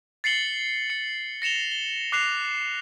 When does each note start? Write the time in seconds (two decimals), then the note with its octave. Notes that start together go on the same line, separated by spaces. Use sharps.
0.24 A6 C7 C#7 F#7 G7
0.90 C#7
1.42 A#6 C#7 E7 F7 G7
1.72 G7
2.12 D6 F#6 C7 F7